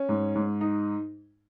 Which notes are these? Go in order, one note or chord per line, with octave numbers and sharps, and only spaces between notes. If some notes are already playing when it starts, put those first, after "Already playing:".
Already playing: C#4
G#2
G#2
D#4